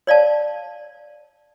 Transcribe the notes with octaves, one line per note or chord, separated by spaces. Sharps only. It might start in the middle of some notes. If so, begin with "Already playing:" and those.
C#5 D5 F5 A5